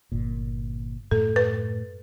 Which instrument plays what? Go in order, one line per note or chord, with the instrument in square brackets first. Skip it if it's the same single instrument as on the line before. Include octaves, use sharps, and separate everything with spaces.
[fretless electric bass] G1 A#2
[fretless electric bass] F#2 A2 A3 [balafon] A4
[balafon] B4